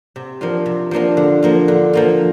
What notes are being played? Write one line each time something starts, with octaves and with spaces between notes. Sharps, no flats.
C3
F3 A#3 D4 F4
C3
F3 A#3 D4 F4
D3
F3 A#3 F4
D3
F3 A#3 F4